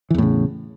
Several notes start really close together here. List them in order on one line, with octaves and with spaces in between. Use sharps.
E3 E2 A2 C#3